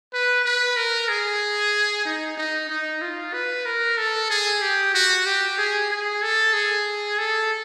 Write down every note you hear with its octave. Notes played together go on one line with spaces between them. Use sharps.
B4
B4
A#4
G#4
D#4
D#4
D#4
F4
B4
A#4
A4
G#4
G4
F#4
G4
G#4
G#4
A4
G#4
A4